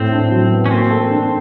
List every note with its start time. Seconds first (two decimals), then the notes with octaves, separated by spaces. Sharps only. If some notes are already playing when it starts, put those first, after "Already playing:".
Already playing: A2 C4
0.12 D4
0.31 F#3
0.51 B3
0.66 C#4
0.70 A#3 C4
0.91 A4
1.10 D4